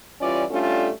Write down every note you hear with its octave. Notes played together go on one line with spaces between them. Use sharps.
E3 G3 C#4 F4 D5
G3 A3 C#4 D4 F4 A4